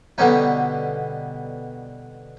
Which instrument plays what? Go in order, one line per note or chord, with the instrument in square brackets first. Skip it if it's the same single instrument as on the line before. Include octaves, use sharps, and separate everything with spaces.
[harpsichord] B2 D3 G3 C#4 D#4